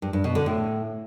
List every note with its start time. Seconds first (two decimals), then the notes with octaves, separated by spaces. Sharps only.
0.02 G2
0.13 G2
0.24 B2
0.35 D3
0.46 A2